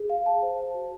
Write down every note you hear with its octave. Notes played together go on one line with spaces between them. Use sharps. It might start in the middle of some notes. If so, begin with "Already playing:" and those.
Already playing: G#4
F5
A5
C5
C5
F#4